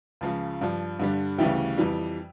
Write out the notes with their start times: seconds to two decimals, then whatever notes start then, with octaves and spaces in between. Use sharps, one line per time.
0.21 C#2 C#3 F3
0.61 G2 F3
0.99 G2 D3 G3
1.38 D2 C#3 E3 G3 E5 G5
1.78 F2 E3 G3